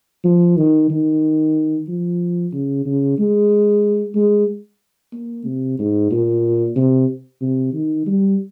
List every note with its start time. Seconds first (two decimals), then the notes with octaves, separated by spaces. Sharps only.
0.24 F3
0.57 D#3
0.90 D#3
1.88 F3
2.53 C#3
2.86 C#3
3.19 G#3
4.15 G#3
5.13 A#3
5.45 C3
5.79 G#2
6.11 A#2
6.76 C3
7.41 C3
7.73 D#3
8.07 G3